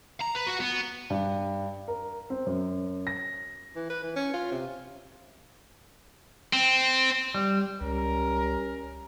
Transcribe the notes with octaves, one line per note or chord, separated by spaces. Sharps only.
A#5
B4
F#4 F#5
B3
G2
A#4
C4
F#2
A#6
E3
B4
E3
C#4
F4
C3
C4
G3
C#2 G3 C#4 A#4